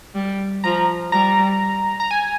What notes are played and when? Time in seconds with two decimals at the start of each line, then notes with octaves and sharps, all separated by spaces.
0.15 G3
0.64 F3 A#5
1.12 G3 A#5
2.00 A#5
2.11 G#5